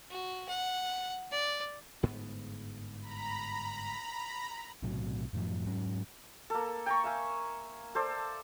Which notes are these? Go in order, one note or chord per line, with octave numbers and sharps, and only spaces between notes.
F#4
F#5
D5
G1 G#2 B3
A#5 B5
B1 A2 C3 F#3
F#2 A2 F3
G#2 F#3 C#4
A#3 A4
G5 A#5 C#6
E5 F5 G#5
A4 C5 D5